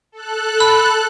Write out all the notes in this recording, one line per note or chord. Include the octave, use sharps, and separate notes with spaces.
A4 F#6
B5